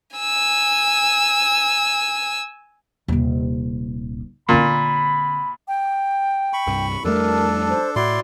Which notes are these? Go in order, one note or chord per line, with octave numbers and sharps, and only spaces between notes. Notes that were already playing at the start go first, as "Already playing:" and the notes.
G#5 E6
D#1 C3
A#2 D3 C4 B5
G5
B5 C#6
C2 G2
F2 G3 A3 D4 A4 A#4
C5
A2 E4 F#4 D5 C6